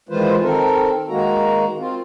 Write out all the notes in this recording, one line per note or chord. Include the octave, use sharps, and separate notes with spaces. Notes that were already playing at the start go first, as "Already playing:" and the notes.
D#3 E3 G#3 F4 B4 C5
D#3 C4 A4 A#4
D#3 G#3 A#3 F#4 A#5
C4 F4